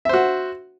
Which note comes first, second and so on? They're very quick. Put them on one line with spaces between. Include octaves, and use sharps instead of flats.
E5 C5 F#4